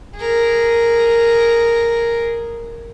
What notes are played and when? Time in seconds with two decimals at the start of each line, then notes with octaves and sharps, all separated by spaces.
0.17 G#4 A#4